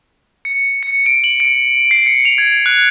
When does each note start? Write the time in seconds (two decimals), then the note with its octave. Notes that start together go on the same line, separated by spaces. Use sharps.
0.45 C#7
0.83 C#7
1.06 D7
1.24 F#7
1.40 D7
1.91 C7
2.06 C#7
2.25 F7
2.38 G#6
2.66 F#6